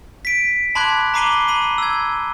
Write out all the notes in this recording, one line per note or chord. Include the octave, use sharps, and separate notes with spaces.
B6 D7
A5 B5 C6 D6 F#6 G#6
A#5 B5 D6 C7 D#7 G7
B5 D#7
E6 G#6